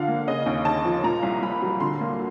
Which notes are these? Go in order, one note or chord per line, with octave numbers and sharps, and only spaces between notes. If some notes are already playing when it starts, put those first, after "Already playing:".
Already playing: D3 F3 D4 F5 F#5
A#3
C#3 D#5
D#2
D#2 A5
F3
A#2 A#5
C2
C2 B5
F#3
D3 C6
A#3